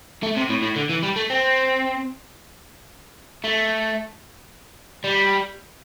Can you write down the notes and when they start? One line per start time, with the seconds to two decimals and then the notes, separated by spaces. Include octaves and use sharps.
0.23 A3
0.36 C3
0.49 A2
0.62 A2
0.76 D3
0.89 E3
1.03 G3
1.16 A3
1.30 C4
3.44 A3
5.04 G3